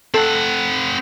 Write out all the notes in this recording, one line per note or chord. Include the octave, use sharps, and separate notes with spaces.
C4 A4 F#5